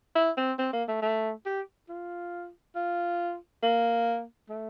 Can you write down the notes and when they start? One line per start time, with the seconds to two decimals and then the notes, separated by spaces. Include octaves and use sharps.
0.15 E4
0.37 C4
0.59 C4
0.73 A#3
0.88 A3
1.02 A3
1.46 G4
1.89 F4
2.75 F4
3.63 A#3
4.49 A3